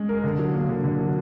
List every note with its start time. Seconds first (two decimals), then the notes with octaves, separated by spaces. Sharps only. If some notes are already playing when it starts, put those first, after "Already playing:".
Already playing: G#3 C#4
0.09 A#4
0.24 D3
0.39 F#3
0.53 A#3
0.69 D3
0.84 D3
0.99 F#3